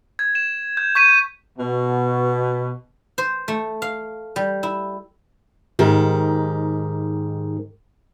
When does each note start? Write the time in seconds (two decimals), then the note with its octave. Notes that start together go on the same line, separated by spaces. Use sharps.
0.19 G#6
0.35 E7
0.77 G6
0.95 C#6 G6 B6 D#7
1.58 B2
3.18 C5
3.48 A3
3.82 F5
4.36 G3
4.63 E4
5.79 G#2 D#3 G4